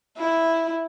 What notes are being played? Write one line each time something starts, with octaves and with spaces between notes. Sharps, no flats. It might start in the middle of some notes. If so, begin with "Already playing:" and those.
E4